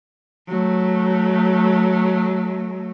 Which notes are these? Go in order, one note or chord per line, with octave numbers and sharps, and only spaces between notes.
F#3 A3